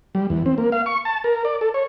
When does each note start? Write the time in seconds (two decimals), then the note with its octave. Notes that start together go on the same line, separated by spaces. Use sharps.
0.15 G3
0.30 E2
0.46 C4
0.58 A#3
0.72 F5
0.86 C#6
1.05 A5
1.24 A#4
1.45 D5
1.61 A4
1.74 C#5